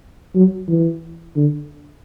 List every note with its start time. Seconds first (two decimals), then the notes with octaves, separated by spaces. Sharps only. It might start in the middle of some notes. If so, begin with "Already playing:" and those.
0.35 F#3
0.68 E3
1.36 D3